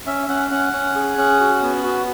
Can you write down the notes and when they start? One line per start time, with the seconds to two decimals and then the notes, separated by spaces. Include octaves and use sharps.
0.06 C#4 E5
0.29 C#4 F#5
0.51 C#4 F#5
0.73 C#4
0.96 G#4
1.18 C#4
1.40 F#4
1.63 B3
1.84 F#4